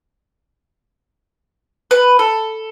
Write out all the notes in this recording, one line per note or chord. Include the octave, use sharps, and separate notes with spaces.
B4
A4